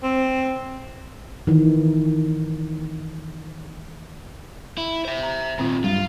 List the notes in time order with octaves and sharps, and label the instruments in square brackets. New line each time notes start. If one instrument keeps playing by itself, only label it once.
[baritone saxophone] C4
[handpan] D#3 E3
[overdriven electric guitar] E4
C5 E5
[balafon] A#5
[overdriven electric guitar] A#2 D#3 [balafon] C4 F4
[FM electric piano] G2 [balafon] F#3 [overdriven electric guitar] F4